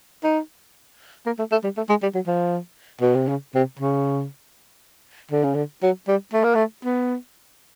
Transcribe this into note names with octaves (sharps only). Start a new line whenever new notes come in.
D#4
A#3
A3
A3
G3
A3
G#3
G3
F#3
F3
B2
C3
C#3
C3
C#3
D3
C#3
D3
F#3
G3
A3
A#3
A3
B3